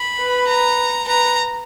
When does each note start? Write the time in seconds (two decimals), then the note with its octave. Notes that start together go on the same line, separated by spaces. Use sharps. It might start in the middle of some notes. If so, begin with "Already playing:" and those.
Already playing: B5
0.18 B4
0.48 A#5
1.07 B4 A#5